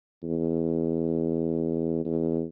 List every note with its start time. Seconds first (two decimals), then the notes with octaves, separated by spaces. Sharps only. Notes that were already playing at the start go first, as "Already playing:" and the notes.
0.23 E2
2.05 E2